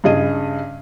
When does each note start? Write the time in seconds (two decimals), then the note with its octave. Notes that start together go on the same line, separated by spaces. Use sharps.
0.04 G2 C#3 G#4 D#5 D#7